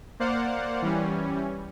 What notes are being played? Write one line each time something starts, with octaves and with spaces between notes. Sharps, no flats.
A#3 C5 D5 F5 F#5
E3 G3 C#4